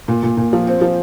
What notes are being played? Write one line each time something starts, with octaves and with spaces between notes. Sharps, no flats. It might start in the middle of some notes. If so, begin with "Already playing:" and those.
A#2
A#2
A#2
F3
C4
F3